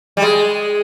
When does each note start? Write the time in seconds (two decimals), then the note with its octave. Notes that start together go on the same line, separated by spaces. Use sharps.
0.17 G3
0.22 G#3